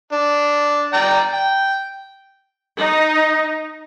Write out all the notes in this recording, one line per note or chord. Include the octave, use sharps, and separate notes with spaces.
D4
D5 G5 A#5
G5
D#4